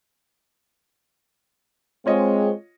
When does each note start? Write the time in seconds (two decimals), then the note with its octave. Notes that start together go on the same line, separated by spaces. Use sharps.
2.06 G#3 C4 F4 C#5 D#5